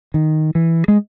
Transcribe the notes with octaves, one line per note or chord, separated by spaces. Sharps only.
D#3
E3
G#3